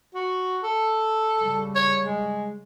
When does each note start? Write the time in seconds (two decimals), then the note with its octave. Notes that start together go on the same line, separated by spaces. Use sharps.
0.15 F#4
0.63 A4
1.41 C#3 G3
1.76 C#5
2.05 G#3